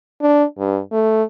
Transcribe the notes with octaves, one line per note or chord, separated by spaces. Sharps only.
D4
G2
A3